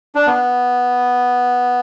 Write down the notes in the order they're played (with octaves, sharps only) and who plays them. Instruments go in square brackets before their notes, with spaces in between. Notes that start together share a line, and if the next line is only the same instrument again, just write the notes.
[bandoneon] D4
B3